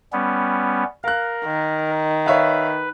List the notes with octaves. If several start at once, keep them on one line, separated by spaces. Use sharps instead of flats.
G3 B3 C#4
A#4 F5 F#6
D#3
B4 C#5 E5 F5